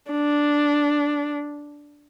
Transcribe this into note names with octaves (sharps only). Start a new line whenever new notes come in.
D4